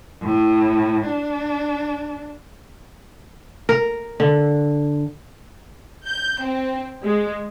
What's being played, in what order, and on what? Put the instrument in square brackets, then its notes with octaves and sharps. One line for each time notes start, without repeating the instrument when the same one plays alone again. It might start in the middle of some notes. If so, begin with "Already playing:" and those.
[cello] A2
D4
[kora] A#4
D3
[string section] G6
C4
G#3